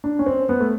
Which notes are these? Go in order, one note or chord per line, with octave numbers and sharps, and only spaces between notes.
D4
C#4
C4
B3
A3